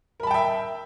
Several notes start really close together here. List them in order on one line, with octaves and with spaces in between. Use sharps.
A#4 B5 A5 G5 E5